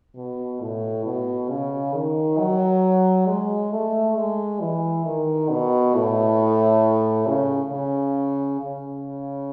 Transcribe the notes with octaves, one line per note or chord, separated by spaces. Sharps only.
B2
A2
B2
C#3
D#3
F#3
G#3
A3
G#3
E3
D#3
B2
A2
C#3
C#3
C#3